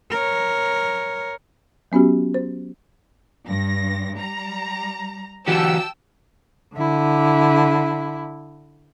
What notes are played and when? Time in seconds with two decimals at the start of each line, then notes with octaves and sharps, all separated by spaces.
0.11 A#4 C#5
1.92 F#3 B3 C#4 F#4 G4
2.34 C5
3.48 G2 A#6
4.17 G3 A#5
5.48 E3 F#4 G4 G5 A5 E6
6.75 D3 E4